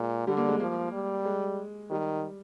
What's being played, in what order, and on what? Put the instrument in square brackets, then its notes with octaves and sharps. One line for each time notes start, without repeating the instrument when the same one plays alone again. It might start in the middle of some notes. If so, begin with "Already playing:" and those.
Already playing: [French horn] A#2 [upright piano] G#3
[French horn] D3 [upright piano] G3
[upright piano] A#3
G#3
[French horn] F3 [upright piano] A#3
[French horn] G3
[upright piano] G#3
[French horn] D#3 [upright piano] G3